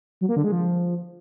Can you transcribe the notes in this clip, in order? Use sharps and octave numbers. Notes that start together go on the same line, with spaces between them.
F#3
A#3
D3
G#3
F3